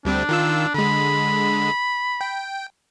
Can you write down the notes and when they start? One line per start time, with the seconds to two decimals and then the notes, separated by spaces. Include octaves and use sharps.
0.05 D2 G3 C4 D4
0.29 D#3 F4 E6
0.74 D3 G#3 B5
2.21 G5